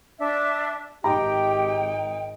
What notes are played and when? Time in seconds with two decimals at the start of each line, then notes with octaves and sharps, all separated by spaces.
0.19 D4 E5
1.04 G#1 D#4 G4 G5 A#5